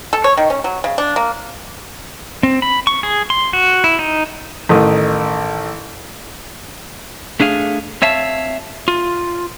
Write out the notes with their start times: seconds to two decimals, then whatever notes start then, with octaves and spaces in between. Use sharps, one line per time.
0.13 A4
0.24 C#5
0.37 D#3
0.50 C#4
0.64 F#3
0.84 C#3
0.98 D4
1.16 A#3
2.43 C4
2.62 B5
2.87 C#6
3.03 G#4
3.30 C6
3.53 F#4
3.84 E4
3.99 D#4
4.69 A1 D#3 A3 D#6
7.40 A3 D4 G#4 F5
8.02 C4 C#5 E5 F5 A5
8.88 F4